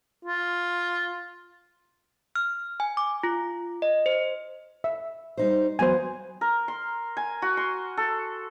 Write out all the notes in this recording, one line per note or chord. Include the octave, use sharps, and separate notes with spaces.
F4
F6
G#5
D6
F4
D#5
C5
E5
G3 D#4 C5
E2 F#3 B3 C5 G#5
A#4
C6
G#5
F#4
C6
A4